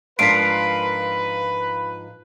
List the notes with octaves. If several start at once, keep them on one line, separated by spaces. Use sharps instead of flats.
G#2 F3 D4 F4 A#4 B4 B6 D7